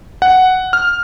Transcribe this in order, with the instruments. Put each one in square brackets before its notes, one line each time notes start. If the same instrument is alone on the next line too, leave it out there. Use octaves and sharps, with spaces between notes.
[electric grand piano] F#5
F6